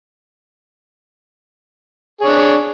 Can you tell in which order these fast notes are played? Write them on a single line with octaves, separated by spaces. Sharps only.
G#4 C#5 D4